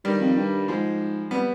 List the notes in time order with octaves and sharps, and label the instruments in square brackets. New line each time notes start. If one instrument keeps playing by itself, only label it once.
[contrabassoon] G2 [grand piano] D#3 G3
[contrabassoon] F2
G2
[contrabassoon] G#2 [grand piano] F3 G#3
[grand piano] G3 B3